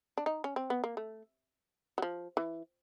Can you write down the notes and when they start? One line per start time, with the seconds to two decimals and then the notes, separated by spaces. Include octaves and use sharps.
0.18 D4
0.26 D#4
0.44 C#4
0.56 C4
0.70 B3
0.84 A#3
0.97 A3
1.98 F#3
2.02 F3
2.37 E3